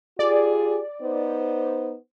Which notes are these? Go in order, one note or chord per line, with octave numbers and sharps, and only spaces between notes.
F4 G4 G#4 D5
B3 D#4 C5